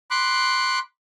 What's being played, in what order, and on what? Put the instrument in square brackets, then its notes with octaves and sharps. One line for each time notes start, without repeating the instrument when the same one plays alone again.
[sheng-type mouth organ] B5 C6 D6 F#6